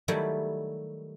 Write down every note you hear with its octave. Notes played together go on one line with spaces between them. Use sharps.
D#3 F#3 G3 A3 E4